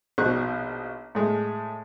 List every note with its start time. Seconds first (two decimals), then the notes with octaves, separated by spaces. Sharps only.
0.18 A#1 B2 D#4 C5 C#6 F#6
1.15 A2 G#3